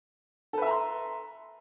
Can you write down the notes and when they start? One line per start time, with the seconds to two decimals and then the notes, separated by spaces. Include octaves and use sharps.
0.53 A4
0.58 B4
0.62 E5
0.66 A#5
0.71 C6